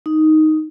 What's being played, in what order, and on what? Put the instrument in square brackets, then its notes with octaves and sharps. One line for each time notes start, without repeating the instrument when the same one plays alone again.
[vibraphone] D#4